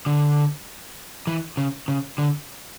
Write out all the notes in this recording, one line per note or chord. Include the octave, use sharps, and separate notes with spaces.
D3
E3
C#3
C#3
D3